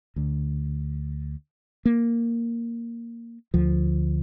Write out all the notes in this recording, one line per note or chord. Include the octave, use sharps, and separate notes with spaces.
D2 D3
A#3
D2 D3 F3